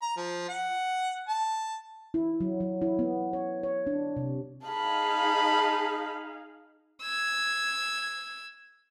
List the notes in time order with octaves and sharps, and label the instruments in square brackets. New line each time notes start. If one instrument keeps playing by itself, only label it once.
[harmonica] A#5
F3
F#5
A5
[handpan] E4
F#3
F#3
E4
B3
C#5
C#5
D4
C3
[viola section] D#4 G#4 F5 [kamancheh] A5 B5
[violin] E6 G#6